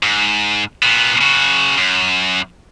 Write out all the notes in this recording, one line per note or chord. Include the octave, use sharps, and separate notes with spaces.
G#2
A#2 B3
C#3 F#4
F#2